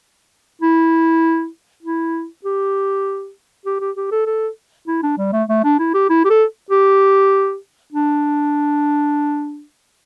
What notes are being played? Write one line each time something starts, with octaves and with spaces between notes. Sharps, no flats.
E4
E4
G4
G4
G4
G4
A4
A4
E4
D4
G3
A3
A3
D4
E4
G4
E4
G4
A4
G4
D4